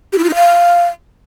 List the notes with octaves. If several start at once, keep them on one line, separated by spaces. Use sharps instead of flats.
G4
E4
F4
D#4
F5